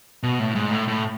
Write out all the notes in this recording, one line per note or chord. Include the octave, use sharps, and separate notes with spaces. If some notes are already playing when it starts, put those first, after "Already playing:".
B2
A2
G#2
A2
A2